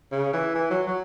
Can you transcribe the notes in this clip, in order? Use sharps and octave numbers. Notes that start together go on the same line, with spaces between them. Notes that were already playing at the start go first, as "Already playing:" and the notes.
C#3
E3
E3
F#3
F#3